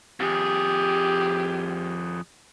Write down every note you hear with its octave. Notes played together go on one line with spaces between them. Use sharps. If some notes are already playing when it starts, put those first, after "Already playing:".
F2 G4 G#4